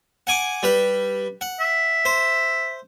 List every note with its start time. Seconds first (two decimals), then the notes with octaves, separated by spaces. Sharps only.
0.27 F#5 G#5 D6
0.63 G3 B4
1.41 F#5
1.60 E5
2.05 C5